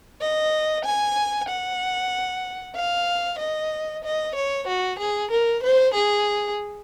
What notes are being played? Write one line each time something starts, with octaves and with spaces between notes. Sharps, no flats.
D#5
G#5
F#5
F5
D#5
D#5
C#5
F#4
G#4
A#4
C5
G#4